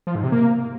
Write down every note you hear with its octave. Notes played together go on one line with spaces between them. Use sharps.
F3
G#2
C3
A#3